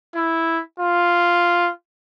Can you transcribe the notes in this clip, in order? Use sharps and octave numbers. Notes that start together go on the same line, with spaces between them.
E4
F4